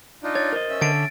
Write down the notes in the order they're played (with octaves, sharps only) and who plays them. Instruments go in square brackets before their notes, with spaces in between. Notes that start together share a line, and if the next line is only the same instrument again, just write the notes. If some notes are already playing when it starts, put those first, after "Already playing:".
[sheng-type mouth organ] D4 D#4 F4
[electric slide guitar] C#5 [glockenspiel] A6
[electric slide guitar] A#4 C5 D#5
[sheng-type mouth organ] C#4 E5
[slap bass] D3 [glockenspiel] A6 D7